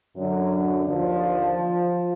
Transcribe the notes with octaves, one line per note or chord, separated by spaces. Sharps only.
F#2 D3 F#3
D#2 D3 F3